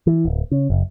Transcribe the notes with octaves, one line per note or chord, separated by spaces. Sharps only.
E3
D1
C#3
F#1